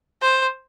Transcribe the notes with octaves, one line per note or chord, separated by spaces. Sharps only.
C5